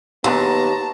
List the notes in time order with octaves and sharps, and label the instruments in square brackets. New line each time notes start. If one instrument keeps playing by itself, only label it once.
[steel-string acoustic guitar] D#2 [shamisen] F#3 G#3 D4 [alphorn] B3 [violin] A5 A#5